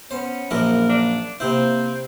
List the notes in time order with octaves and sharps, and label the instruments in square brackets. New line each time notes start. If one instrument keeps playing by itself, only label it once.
[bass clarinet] B3 [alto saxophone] C#4 [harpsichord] C5
[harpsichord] A#1 F#2 E4 [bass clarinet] A#3 [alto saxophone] A#4
[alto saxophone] D4
[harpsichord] C3 E4 [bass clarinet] A#3 [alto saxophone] C4